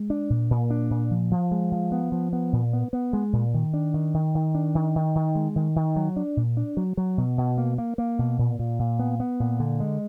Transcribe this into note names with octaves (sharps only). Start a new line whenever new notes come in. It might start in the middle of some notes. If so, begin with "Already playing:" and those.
Already playing: G#3
D4
A#2
A#2
D4
A#2
F3
F3
G#3
F3
B3
F3
B3
A#2
B3
B3
G#3
A#2
D#3
D4
D#3
D#3
D#3
D4
D#3
D#3
D#3
G#3
D#3
D#3
F#3
D4
A#2
D4
F#3
F#3
B2
B2
A#3
A#3
A#3
B2
A#2
A#2
A#2
B3
B3
A#2
D3
G#3